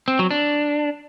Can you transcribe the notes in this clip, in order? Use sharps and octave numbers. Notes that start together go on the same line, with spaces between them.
C4
F#3
D4